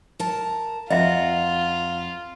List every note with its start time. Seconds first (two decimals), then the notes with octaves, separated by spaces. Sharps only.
0.20 A#4 A5
0.90 F2 F4 D#5 E5 F#5 A#5